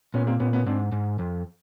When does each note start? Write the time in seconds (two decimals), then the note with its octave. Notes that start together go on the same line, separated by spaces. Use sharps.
0.14 A#2 B3 C#4
0.27 A#3 C4
0.40 A#2 B3 C#4
0.53 B3 C#4
0.67 G#2 C4 D4
0.92 G#2
1.19 F2